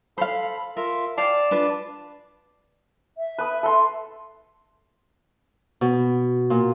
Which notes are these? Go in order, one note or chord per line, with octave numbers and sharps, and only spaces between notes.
A4 C5 F5 B5
F4 A#4 E5
C5 D5 F5 G5 A5
D4 F4 B4
E5
B4 D#6
A4 C6
B2
A#2